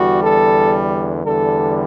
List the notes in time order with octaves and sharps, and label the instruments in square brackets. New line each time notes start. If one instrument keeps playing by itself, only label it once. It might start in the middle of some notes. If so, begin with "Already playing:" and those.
Already playing: [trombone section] E2 D3 G3 F#4
A4
E2 D3 G3 A4